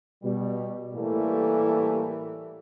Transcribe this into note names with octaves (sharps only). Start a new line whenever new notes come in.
B2 G3
A2 E3 G3 A3 A#3